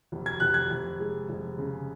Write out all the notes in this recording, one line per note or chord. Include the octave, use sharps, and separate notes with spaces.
F1
G#6
F1 F#6
G#6
F1
G#3
F1
C#3